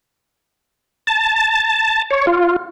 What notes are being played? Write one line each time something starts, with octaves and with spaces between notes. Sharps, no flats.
A5
C#5
F4